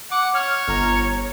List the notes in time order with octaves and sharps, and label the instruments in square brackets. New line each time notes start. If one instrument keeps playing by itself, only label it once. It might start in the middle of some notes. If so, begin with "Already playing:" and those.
[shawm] F#5 [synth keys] D6
[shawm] C#5 [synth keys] F6
[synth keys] G1 A#5